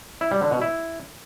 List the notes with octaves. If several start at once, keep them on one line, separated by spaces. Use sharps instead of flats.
E4
G3
D3
B2
E4